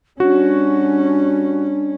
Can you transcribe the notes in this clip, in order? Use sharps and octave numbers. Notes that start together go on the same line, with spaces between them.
G3 C#4 D4 F#4